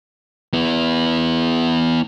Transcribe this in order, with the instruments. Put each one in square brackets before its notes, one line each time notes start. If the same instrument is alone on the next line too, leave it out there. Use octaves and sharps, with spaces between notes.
[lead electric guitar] B3 E4